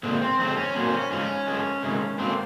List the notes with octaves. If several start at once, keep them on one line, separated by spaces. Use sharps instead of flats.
A#2 G#3 C4
C4
F2 C#3 G#3 C4
C#4
A#2 F#3 A#3 C4
C#4
G#2 F3 G#3 C#4
F#2 F3 G#3
C3 D#3 G#3
G#2 F#3 A#3 C4